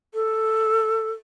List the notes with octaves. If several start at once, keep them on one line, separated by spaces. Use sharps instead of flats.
A4